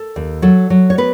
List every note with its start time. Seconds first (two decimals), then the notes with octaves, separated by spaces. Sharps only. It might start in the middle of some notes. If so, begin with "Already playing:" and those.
Already playing: A4
0.16 D#2
0.42 F#3 A4
0.70 F#3
0.90 C#5
0.98 B3 B4